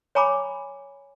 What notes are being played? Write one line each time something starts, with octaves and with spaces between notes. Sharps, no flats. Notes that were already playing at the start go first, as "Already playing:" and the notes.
C#5 G#5 A#5 B5 D6